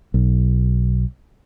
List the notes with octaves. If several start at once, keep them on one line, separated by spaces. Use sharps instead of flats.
B1